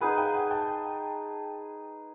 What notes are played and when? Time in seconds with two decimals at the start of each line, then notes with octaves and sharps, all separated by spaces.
0.01 D#4 G#4 B4 F#5 G#5
0.17 F5 G5
0.34 F#5 G#5
0.51 G5 A5